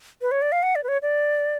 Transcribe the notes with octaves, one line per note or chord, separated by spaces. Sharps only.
B4
C#5
D5
F5
F#5
D5
B4
C#5
D5